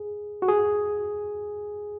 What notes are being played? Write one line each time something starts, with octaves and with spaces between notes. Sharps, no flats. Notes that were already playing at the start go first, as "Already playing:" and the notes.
Already playing: G#4
F#4
G#4